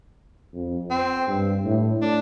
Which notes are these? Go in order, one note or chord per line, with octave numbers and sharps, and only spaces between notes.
F2
C4
G2
A2
D4